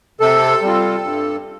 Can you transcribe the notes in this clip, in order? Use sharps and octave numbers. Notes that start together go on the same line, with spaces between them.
C3 A4
G3 C4 F4
G2